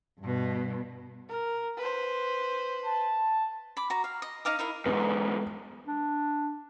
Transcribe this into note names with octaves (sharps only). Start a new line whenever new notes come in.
G2 B2
A#4
B4 C5
A5
B5 D6
F#4 A#5
F5
D#5
D#4 D#5 F5 D6
D#4 E4 A#4 F5
E2 G#2 B3
D4